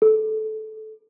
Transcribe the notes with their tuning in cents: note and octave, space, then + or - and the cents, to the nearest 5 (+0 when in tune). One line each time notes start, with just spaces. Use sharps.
A4 -15